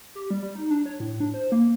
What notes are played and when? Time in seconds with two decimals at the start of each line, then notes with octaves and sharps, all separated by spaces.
0.15 G4
0.31 G3
0.42 G3
0.55 D#4
0.71 D4
0.86 C#5
1.00 A2
1.20 D4
1.34 C5
1.52 A#3